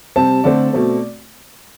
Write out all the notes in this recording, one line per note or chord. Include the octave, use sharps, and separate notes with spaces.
C3 G3 C4 A5
D3 A3 C4 D5
B2 A3 C4